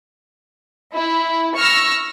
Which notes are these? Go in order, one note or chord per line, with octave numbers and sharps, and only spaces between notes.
E4
C#6 E6 F6 A#6